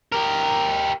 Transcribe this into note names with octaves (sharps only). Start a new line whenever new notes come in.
G4 A#4